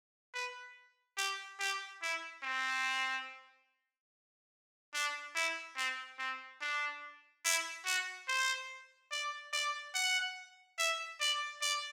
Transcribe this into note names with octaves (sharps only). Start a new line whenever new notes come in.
B4
G4
G4
E4
C4
D4
E4
C4
C4
D4
E4
F#4
C5
D5
D5
F#5
E5
D5
D5